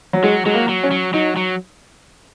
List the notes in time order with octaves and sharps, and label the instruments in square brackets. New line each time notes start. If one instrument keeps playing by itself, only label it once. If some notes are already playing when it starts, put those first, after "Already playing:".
[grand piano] F#3
[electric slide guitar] F#3 [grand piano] G#3
[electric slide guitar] F#3 [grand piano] G#3
[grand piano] A#3
[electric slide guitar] F#3
[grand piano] C#4
[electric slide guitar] F#3
[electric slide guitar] F#3 [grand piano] D#4
[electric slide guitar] F#3